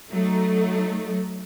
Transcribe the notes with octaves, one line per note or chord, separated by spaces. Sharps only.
F#3 A3 D#4